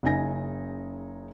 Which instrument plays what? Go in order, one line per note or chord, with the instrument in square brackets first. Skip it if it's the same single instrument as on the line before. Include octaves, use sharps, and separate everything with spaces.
[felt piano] F#1 C#3 D#4 G#5 A#6